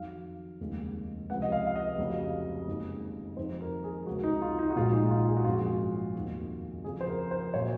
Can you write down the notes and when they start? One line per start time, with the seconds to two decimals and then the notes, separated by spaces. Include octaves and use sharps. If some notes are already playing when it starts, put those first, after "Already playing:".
Already playing: F2 D#3 F#3 F5
0.60 F1 D#2 C#3 G#3
1.30 C#2 C3 F3 F#5
1.42 D#5
1.52 F5
1.67 F5
1.76 D#5
1.98 F1 F2 C#3 F#3
2.68 F#1 F#2 D#3 G#3
3.37 F2 D#3 F#3 C5
3.61 A#4
3.84 G#4
4.07 C#2 C3 F#3 F#4
4.24 D#4
4.42 F4
4.59 D#4
4.70 F#4
4.76 A#1 A#2 G#3 F4
4.93 D#4
5.11 F4
5.29 G#4
5.37 F#4
5.44 G#1 F#2 F3 G#3 F4
5.54 F#4
6.15 F1 D#2 D#3 F#3
6.84 F2 C#3 F3 G#4
7.01 C5
7.07 A#4
7.31 C5
7.54 A#2 F#3 C#5